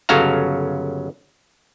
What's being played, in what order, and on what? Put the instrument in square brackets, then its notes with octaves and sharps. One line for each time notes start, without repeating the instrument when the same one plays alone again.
[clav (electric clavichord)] G1 C#3 F#3 A4 F5 A#5